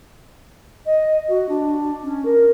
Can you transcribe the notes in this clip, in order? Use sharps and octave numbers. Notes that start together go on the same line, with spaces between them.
D#5
F#4
D4
C#4
A#4